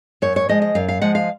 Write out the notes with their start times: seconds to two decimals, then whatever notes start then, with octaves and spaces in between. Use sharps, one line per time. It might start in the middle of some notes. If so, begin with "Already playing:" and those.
0.22 F#2 C#5
0.36 C#5
0.49 F3 G#3 D#5
0.62 D#5
0.75 F#2 F5
0.88 F5
1.01 F3 G#3 F#5
1.15 F5